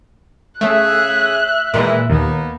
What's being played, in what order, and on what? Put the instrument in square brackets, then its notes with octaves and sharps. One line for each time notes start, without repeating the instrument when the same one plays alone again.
[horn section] C#3 G#4 [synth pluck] A3 [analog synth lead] E5 [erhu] F#6
[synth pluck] A#2 [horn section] D#3 E3 G#3
[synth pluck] D#2 [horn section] A#3 B3 D#4